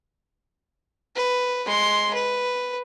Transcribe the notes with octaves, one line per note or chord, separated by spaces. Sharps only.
B4
G#3 C6
B4